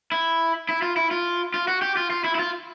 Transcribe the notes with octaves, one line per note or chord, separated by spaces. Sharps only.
E4
E4
F4
E4
F4
F4
F#4
G4
F4
F4
E4
E4
F4